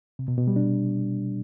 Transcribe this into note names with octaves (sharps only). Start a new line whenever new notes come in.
C3
B2
B2
G3
D4